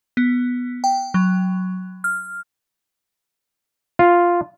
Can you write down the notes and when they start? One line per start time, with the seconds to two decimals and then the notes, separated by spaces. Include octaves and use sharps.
0.17 B3
0.84 G5
1.14 F#3
2.04 F6
3.99 F4